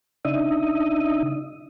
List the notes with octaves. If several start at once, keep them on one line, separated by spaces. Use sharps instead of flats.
C#3 D4 D#4 E5 D#6